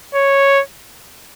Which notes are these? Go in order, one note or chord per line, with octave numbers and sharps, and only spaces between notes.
C#5